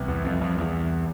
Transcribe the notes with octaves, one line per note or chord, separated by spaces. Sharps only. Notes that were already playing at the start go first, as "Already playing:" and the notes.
Already playing: C2 C3 E3 B3 E4
E2
F2
F2
E2